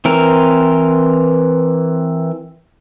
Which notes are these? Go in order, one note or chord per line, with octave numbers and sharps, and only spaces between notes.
E3 C4 A#4